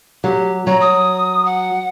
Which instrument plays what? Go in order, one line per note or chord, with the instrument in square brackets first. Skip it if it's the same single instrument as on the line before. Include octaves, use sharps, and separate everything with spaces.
[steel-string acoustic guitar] F#3 [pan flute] G4
[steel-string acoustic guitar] F#3 [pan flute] A#5
[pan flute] D#6
F#5